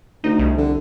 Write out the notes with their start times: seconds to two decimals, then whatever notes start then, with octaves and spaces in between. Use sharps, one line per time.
0.24 D2 D#4
0.39 C2
0.57 D3